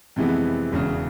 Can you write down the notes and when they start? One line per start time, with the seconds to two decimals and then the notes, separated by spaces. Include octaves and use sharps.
0.16 F2 C3 E3 G#3 B3
0.72 E1 E2 C#3